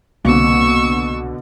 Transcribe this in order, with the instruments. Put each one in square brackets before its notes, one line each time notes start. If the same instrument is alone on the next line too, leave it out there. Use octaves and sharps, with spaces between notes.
[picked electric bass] C2 C4 [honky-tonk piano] B2 D3 [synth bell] A#3 [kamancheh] C#6 E6